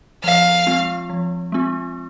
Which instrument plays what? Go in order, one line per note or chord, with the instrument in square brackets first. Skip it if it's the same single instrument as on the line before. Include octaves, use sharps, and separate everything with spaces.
[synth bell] F3 [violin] F5
[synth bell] G#3 C4 F4
F3
G#3 C4 F4